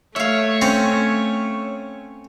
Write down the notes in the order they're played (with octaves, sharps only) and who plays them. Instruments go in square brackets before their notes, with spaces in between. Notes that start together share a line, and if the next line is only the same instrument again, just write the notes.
[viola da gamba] A3 [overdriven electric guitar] C#5 [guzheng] E5 F5
[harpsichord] C4 [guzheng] C#4